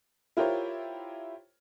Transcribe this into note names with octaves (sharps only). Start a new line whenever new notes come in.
E4 F4 G4 A#4 C5 C#5